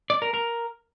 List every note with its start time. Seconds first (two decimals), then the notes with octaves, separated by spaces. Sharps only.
0.10 D5
0.22 A#4
0.34 A#4